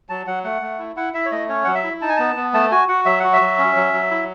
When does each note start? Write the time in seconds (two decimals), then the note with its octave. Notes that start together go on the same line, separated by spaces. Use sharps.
0.09 F#3 A5
0.27 F#3 F#5
0.44 A3 F#5
0.62 A3
0.79 E4
0.96 E4 F#5
1.14 E4 E5
1.25 C#5
1.31 A3 D#5
1.49 C#4 C#5
1.64 F#3 F#5
1.75 E5
1.84 E4
2.01 D#4 A5
2.09 G#5
2.17 B3 A5
2.36 B3
2.54 A3 A5
2.71 F#4 G#5
2.89 F#4 F#5
3.05 F#3 E5
3.20 F#4 F#5
3.33 E5
3.41 F#3
3.58 C#4
3.76 F#3
3.93 F#3
4.11 E4